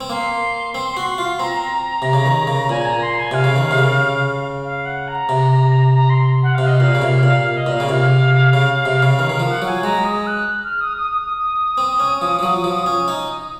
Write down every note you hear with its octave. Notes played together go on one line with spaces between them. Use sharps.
C4
A#3 C6
C4
F#4
F4
C4 A#5
C3
C#3
D#3
C#3
A#2 G#5
A#5
C6
G#5
C3 F5
C#3
D#3
C3
C#3
F5
F#5
A#5
C3
A#5
C6
F#5
C3 F5
D#5
A#2 F5
C#3
C3
A#2 F5
F5
D#5
A#2
F5
C#3
C3 F5
C#3
C3
C#3
D#3 F5
D#3
F3 F5
F#5
F#3 G#5
G#3 A#5
D#6
F#6
F6
D#6
D#6
D#6
C4
C#4
F3
F3
F#3
F3
C#4
D#4